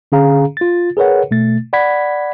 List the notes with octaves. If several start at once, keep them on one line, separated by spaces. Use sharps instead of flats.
D3 C#4 G#4 F5 A#5
F4 A6
G#4 A#4 B4 C#5 F#5
B2 A3 A6
D5 F#5 B5 G#6 B6